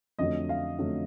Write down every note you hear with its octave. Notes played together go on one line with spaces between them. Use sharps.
F2 D3 F#3 A3 D#5
F5
F2 D3 F#3 A3